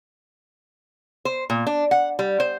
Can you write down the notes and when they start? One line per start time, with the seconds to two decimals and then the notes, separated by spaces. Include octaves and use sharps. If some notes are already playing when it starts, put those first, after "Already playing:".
1.25 C5
1.50 A#2
1.67 D4
1.91 F#5
2.19 G3
2.40 C5